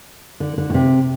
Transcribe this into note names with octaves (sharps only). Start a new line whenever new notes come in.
D3
D3
B2
C3